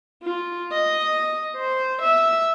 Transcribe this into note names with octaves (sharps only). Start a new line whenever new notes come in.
F4
D#5
C5
E5